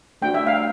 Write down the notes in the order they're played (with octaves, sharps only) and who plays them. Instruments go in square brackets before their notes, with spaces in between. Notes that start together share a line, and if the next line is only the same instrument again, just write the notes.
[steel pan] A3 D4 F#4 G5
E5
F5